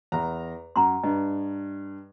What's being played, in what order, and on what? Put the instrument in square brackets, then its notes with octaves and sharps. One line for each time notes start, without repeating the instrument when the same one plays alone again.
[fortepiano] E2 A#5
[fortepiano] F#2 [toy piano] A#5 C6
[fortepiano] G2 [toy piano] D#5